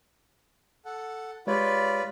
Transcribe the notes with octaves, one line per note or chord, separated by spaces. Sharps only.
A4 F#5
G#3 F4 G4 B4 C#5 D5